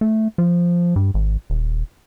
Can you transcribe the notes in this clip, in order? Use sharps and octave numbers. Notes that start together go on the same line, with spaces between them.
A3
F3
G2
G#1
D#1